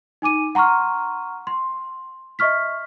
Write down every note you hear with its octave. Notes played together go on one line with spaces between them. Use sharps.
D#4 G#5 D6 D#7
F#5 A#5 C6 C#6 F6
C6
D#5 E5 C#6 F6 B6